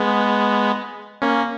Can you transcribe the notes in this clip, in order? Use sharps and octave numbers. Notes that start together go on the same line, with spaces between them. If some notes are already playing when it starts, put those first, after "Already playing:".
Already playing: G#3 B3
A#3 C#4